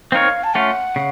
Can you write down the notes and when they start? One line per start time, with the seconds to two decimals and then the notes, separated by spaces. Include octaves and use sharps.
0.12 C4 D#4 A#4 C#5 F5
0.44 A5
0.54 A3 C#4 F4 F#5
0.96 C#3